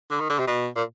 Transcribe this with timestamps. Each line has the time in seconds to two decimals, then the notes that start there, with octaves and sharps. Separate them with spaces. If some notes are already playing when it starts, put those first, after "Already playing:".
0.11 D3
0.20 D#3
0.29 D3
0.39 C3
0.47 B2
0.76 A#2